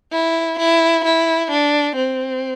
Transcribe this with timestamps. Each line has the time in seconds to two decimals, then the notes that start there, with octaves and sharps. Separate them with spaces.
0.12 E4
0.59 E4
1.04 E4
1.51 D4
1.96 C4